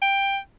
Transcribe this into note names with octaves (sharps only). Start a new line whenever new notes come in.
G5